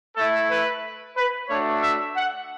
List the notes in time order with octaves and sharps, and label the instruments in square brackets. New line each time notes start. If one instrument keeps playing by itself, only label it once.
[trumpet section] A3 E4 A4
B4
B4
A3 D4 F#4 C#5
E5
F#5